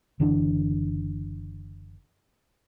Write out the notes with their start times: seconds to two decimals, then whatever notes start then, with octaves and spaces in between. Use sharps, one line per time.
0.20 F#1 D3 E3 D4